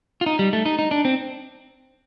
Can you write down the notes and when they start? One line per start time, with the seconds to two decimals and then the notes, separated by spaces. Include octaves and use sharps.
0.21 F4
0.26 D#4
0.39 G3
0.53 A3
0.66 D#4
0.79 D#4
0.91 D4
1.05 C4